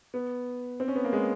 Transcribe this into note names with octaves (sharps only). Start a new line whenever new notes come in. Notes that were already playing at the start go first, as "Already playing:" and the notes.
B3
C4
C#4
B3
A#3
G#3